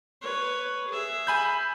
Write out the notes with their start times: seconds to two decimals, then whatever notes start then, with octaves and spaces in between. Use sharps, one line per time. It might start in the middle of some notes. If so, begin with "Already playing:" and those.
0.21 B4 C#5
0.89 G#4 E5
1.27 G#5 B5 G6